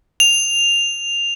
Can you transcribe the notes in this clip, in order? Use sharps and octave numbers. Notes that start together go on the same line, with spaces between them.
F7